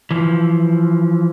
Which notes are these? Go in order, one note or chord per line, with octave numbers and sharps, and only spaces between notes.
E3 F3